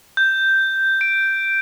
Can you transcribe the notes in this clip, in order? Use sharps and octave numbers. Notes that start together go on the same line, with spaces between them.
G6
D7